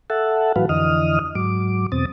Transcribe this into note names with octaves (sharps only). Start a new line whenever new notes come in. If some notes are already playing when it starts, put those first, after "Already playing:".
A4 E5 F#5 A5
A2 E3 F#3 F#4 B4 F5
F2 D3 E3 D#5 D#6 F6
G#2 F#3 D6
E2 B2 C4 D#6 A6